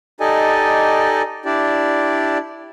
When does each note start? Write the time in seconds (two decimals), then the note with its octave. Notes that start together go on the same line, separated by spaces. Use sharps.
0.20 D#4 G4 A4 D5 D#5 G#5
1.45 D4 E4 G4 D5